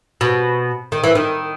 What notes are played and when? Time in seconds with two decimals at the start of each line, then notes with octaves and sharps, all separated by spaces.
0.21 B2
0.92 D#3
1.04 E3
1.15 D#3